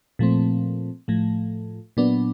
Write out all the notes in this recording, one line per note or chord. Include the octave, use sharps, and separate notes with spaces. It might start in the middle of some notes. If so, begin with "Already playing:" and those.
A#2 F3 A3 C4
A2 F3 A3
A#2 F#3 B3 D4